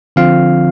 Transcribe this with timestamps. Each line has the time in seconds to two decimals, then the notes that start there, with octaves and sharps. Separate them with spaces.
0.16 D3 F3 C4 F4 F5